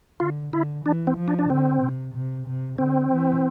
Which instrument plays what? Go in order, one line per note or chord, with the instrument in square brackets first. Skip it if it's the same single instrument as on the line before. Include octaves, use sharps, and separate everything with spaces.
[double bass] D3 [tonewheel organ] F4
[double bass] D3 [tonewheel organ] E4
[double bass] E3 [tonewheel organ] D4
[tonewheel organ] C4
[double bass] F3
[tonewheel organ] D4
D4
[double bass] D3 [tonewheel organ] C4
[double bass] C3
C3
C3
[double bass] D3 [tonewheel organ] C4
[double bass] E3